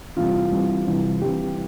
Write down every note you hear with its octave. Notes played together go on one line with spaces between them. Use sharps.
C2 C3 E3 F4
C2 C3 E3
C2 C3 E3
C2 C3 E3 G4